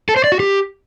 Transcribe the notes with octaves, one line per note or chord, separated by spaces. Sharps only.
A4
C5
D5
F#4
G4